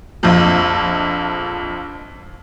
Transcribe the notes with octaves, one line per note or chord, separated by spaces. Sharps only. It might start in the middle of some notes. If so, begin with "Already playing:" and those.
A#1 F2